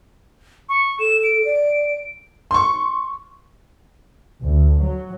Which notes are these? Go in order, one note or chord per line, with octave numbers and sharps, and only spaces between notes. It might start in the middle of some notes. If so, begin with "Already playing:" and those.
C#6
A4 E7
D7
D5
C6 C#6
D2
F#3